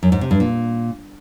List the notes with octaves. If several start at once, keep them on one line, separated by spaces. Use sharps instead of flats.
F#2
G#2
C3
G2
A#2